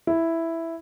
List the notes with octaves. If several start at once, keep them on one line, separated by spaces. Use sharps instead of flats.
E4